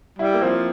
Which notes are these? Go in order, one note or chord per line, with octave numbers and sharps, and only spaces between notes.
G3 E4
A#3
F3 C4